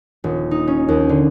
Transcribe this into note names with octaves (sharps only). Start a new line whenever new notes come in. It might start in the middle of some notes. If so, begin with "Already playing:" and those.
D#1
D#4
C#4
D#2
D3